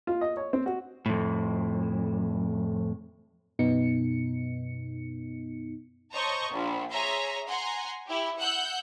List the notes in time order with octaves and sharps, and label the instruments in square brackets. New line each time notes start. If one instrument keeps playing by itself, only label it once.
[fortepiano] F4
D#5
C#5
C4
F#4
[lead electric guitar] F2 A2
[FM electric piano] F#2 B2 B3 D#4 C#7
[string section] C5 C#5 D#5 A5 A#5 C#6
A#1 F4
G#4 C#5 E5 A#5 C6
F#5 G#5 A#5 C6
E4 G4
F#5 E6 F#6 G6